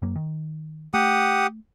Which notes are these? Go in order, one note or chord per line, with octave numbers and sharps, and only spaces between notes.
F#2 F#3 A#3
D#3
A3 G4 F#5 D#6